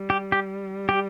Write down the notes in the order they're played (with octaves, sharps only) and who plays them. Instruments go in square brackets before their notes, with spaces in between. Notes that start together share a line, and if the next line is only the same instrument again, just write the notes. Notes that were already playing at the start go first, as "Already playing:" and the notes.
Already playing: [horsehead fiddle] G3
[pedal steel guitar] G4
G4
G4